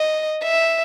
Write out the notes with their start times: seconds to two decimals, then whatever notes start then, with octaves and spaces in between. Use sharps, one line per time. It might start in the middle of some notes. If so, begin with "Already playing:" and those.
Already playing: D#5
0.44 E5